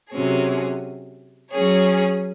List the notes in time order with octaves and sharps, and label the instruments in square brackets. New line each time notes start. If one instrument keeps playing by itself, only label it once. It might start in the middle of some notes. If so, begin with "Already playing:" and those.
[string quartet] C3 F#3 C#4 G#4
F#3 C#4 G#4 C#5